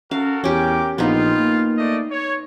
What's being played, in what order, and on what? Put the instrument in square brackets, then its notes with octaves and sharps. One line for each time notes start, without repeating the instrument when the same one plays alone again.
[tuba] C#4 [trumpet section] F#4 A4 A#4 [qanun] F5
[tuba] E2 [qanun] C#4 G4 [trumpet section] A#4 G5 D6
[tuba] A#1 [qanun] B3 D#4 [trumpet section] F4
[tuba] A#3
[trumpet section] A3 D5 D#5
C#5